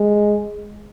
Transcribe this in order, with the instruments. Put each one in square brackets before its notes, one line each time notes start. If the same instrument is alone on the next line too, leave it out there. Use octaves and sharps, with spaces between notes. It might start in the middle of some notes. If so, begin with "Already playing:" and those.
Already playing: [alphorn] G#3